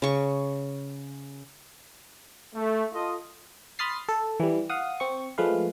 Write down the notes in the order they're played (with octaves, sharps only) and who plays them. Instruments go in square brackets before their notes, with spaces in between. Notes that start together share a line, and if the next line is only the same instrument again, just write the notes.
[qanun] C#3 C#6
[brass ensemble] A3
F4 A4 D#5
[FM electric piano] B5 C6 D#6 F6 A6 C7
A4
E3 G3
F5 F#5 D#6
C4 C#6
F3 G#3 A3 B4 F5